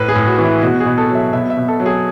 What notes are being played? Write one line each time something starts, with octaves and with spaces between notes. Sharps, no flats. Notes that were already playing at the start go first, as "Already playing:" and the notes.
Already playing: A2 B4
G#4
A2
F#4
E3 F#4
E4
B2 F#4
G#4
B2
A4
F#3 E5
B2 E5
E5
B2
A4
F#3
G#4